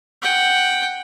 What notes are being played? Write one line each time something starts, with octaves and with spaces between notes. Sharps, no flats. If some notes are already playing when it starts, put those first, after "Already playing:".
F#5 G5